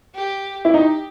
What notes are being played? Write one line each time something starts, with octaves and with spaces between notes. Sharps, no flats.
G4
E4
D#4 G4